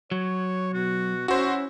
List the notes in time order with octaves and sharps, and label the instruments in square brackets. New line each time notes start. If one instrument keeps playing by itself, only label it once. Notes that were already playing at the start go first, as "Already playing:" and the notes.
[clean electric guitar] F#3 [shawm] C#5
[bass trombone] B2 [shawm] F#4
[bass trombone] C#4 [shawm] E4 [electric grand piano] F#4 C5